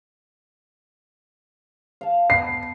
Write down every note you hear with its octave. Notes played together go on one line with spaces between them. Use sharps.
F5 A5
B3 C7